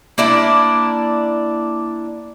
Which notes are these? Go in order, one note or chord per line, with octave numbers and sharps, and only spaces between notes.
A#3 D4 E4 D5